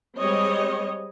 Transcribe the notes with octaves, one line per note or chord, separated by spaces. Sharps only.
G3 G#3 C4 C#5 D#5